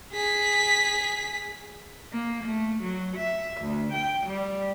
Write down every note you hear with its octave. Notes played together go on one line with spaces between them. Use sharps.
G#4 B6
A#3
A3
F#3
E5
D2
G5
G3